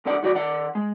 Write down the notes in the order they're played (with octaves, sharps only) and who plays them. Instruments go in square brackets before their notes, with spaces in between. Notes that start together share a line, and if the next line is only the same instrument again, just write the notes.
[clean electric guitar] B1 F#2 D3 D5 F#5
D#3 F#3 F#4 D5
D#3 D5 F#5
G#3